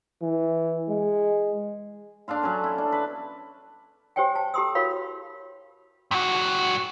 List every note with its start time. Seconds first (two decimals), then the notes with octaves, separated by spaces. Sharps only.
0.22 E3
0.89 G#3
2.28 D4 A4 F5 C6
2.43 F#3 C#4
2.64 E4
2.78 D4
2.92 B4
4.16 G4 C5 C#5 G5 G#5
4.36 A5
4.54 G4 A4 A#5 C6 D#6 E6
4.75 E4 F#4 A#4 C#5 F5 B5
6.11 G2 F#4